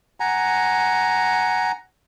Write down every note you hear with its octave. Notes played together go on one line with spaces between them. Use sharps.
F#5 G#5 A#5